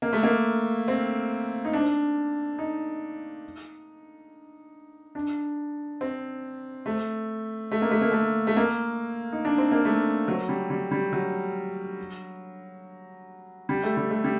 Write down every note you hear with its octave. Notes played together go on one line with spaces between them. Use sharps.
A#3
A3
A#3
C4
D#4
D4
D#4
D4
C4
A3
A3
A#3
A3
A#3
A3
A3
A#3
D#4
D4
C4
A#3
A3
F#3
G3
G3
G3
F#3
G3
A3
G3
A3
G3